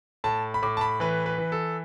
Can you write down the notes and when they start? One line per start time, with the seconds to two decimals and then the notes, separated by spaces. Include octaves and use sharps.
0.24 A2 A5
0.54 B5
0.62 A2 D6
0.77 A5
0.81 B5
1.00 E3 B4
1.26 B4
1.38 E3
1.52 A4